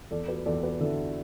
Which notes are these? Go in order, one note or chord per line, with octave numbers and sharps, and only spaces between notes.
E2 A4 D5
F#4 B4
E2 A4 D5
F#4 B4
D3 E4 A4